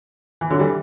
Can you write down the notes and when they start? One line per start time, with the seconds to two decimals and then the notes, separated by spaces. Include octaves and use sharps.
0.41 E3
0.50 D3 F#3
0.60 E3 G3